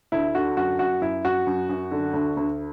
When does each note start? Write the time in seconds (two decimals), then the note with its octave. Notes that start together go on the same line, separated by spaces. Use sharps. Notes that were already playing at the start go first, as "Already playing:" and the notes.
0.12 D2 E4
0.35 D3 F#4
0.57 F#2 F#4
0.79 F#2 F#4
1.01 F#2 E4
1.24 F#2 F#4
1.47 F#2
1.69 F#2
1.91 D3
2.13 D2
2.37 D2